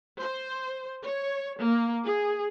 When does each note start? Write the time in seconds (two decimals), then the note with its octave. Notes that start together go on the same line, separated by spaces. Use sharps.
0.20 C5
1.02 C#5
1.60 A#3
2.06 G#4